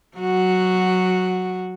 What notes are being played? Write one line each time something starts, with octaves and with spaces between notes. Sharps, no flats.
F#3 F#4